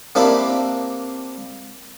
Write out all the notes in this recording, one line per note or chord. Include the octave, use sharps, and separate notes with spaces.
A#3 C4 D4 E4 G4